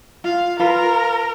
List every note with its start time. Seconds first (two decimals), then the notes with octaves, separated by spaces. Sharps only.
0.24 F4 F5
0.59 F4 A#4 B4